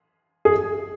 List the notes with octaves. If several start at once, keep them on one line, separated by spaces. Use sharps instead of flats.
G#4